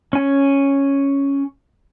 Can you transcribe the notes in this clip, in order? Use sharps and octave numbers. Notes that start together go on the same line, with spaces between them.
C#4 G#5